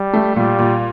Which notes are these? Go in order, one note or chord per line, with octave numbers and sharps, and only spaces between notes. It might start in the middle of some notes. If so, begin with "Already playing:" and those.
Already playing: G3
A3
A#2 G3
A#2